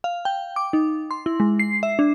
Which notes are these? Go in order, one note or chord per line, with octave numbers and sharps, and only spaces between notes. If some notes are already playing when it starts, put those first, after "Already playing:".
F5
G5
D6
D#4
C6
E4
G#3
C7
E5
D4